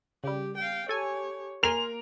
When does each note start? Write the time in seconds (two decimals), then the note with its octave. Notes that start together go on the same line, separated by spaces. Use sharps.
0.24 C#3 G3 G4
0.57 F5 G5
0.89 G4 A4 C#5 G#5
1.63 A#3 A#4 G#5 C6 F6 F7